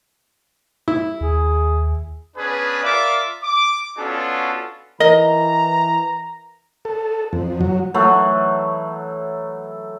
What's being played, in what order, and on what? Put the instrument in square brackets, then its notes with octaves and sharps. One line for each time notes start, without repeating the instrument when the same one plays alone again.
[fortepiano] E4
[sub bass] D#2 [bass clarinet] G#4
[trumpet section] B3 C#4 D4 G#4 B4
F4 A#4 D5 E5 F5 D6
D6
B3 C#4 D4 F4 F#4 A4
[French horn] E3 [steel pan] A#4 [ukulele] D#5 [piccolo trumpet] A#5
[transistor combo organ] A4
F2
F#3
[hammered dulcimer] E3 F#3 A3